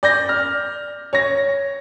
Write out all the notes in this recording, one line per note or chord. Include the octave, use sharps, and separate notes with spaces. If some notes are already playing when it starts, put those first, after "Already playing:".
D5 G6 A#6
F6
C#5 A#6